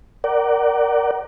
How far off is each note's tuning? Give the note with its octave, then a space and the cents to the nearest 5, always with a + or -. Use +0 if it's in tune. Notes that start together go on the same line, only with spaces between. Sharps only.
A#4 +5 D5 +0 F#5 +35